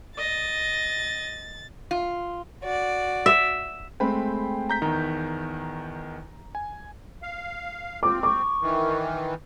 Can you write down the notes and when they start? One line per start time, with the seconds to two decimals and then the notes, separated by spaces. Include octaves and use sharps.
0.18 D#5 A6
1.91 F4
2.62 F#4 D5
3.26 E5
4.00 G#3 A3 C4 G5 B5
4.69 A#5 G6 B6
4.82 E2 D#3 A#5
6.55 G#5
7.23 F5
8.03 C4 F4 D6
8.23 C#6 D6
8.62 D#3 E3